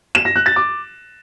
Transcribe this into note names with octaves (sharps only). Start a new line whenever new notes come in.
E7
A#6
F#6
A6
D6